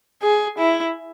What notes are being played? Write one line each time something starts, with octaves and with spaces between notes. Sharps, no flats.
G#4
E4